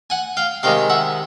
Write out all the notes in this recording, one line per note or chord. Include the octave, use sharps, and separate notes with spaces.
F#5 G#5
F5 G5
C3 D#3 G#3 F5 G5
E5 F#5